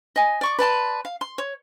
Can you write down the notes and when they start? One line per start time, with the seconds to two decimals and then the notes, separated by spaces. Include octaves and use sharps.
0.16 D#5 G#5
0.41 D5 C#6 D6
0.59 B4 D5 A5 C6
1.05 F5
1.21 C6
1.38 C#5